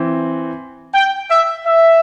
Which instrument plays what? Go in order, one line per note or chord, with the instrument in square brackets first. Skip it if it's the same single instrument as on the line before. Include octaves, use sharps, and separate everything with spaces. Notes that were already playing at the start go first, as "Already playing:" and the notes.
Already playing: [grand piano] E3 C4
[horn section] G5
E5
E5